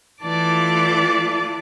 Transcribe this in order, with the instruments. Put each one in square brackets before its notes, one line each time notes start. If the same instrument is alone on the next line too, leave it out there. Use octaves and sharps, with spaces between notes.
[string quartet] E3 A3 F4 D5 A5 D6